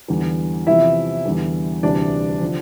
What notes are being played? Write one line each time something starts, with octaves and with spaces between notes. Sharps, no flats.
E2 D3 G3
E2 C3 F3 E4 E5
E2 D3 G3
D2 C3 E3 G3 D4 D5
D3 F3